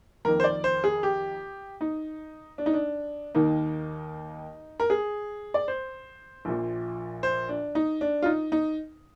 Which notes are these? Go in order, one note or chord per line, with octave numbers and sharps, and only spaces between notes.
F2 D#3 A#3 A#4
C5
D5
C5
G#4
G4
D#4
D4
D#4
D4
D#2 D#3 A#3 D#4
A#4
G#4
D5
C5
A#1 A#2 F3
C5
D4
D#4
D4
F4
D#4
D#4